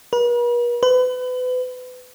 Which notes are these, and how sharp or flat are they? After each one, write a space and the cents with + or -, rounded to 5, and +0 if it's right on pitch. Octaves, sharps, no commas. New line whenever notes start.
B4 -45
B4 +35